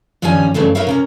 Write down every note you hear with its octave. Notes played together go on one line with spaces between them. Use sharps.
G2 D#3 F3 G3 C#4 G#5
G2 C#3 E3 A3 C4
D#4 A#4 B4 C#5 E5 F5
C3 C#4 A#4